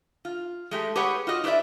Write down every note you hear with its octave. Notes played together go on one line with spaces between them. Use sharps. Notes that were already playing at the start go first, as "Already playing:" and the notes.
F4
G#3 A3 G4
G4 G#4 B4 C#5 F#5
F4 F#4 D#5
E4 G4 B4 D5 E5